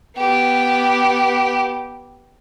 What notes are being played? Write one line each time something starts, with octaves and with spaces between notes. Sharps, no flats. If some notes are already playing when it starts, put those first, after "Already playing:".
B3 G4